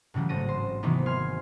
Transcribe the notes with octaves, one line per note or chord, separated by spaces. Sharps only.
A2 C#3 E3 F#3 G3
G#1 A3 A#6 D#7
C5
C3 D#3 E3 F#3 A#3 B3
G#5 C6 F6